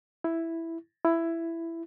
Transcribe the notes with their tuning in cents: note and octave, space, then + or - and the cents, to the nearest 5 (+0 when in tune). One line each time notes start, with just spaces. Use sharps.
E4 +0
E4 +10